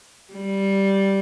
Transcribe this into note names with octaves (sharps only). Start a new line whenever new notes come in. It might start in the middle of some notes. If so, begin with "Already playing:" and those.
G3